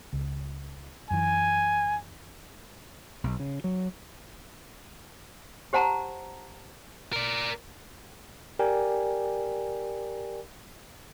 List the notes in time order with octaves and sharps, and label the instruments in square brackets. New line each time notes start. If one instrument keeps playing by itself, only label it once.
[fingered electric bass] C#2
[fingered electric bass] F#2 E3 [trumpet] G#5
[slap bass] B1
C#3
F#3
[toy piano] G4 C5 F#5 A5 A#5
[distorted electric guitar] A#4 D5
[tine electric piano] G4 A#4 D5 G5 G#5